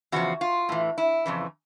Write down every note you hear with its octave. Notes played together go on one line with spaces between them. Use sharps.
E2 C#3 F3 F#4
F4
A2 E3
E4
F2 C#3 E3